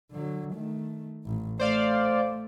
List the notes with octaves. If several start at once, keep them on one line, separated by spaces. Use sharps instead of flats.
D3 F#3
D#3 A3
A1
A3 C5 D5 F5